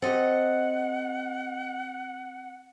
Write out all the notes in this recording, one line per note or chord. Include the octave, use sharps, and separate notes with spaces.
C4 G4 A4 D#5 F#5